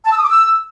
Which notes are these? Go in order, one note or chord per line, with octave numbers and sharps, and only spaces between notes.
A5
E6
D#6
D6
E6